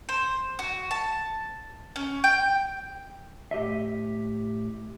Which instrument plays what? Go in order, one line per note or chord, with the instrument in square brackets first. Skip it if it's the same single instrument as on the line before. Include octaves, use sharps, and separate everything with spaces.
[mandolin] C5
F#4
A5
C#4
G5
[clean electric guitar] A2 G4 D#5 E5